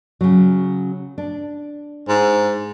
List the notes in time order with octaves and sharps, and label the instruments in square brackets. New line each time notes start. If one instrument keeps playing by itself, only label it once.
[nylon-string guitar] C#3 F#3
D4
[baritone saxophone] G#2